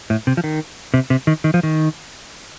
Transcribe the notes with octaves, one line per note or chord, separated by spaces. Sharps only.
A2
C3
F3
D#3
C3
C3
D#3
D#3
F3
D#3